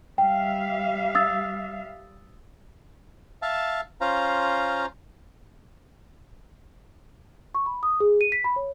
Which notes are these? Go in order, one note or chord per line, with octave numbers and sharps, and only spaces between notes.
G3 E5 F5 G5
D#6 E6 A6
E5 F5 A5
C#4 F4 C5 F5 A#5
C#6
B5
D#6
G#4
D#7
B6
B5
C#5